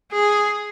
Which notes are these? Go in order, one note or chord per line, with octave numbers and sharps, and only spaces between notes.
G#4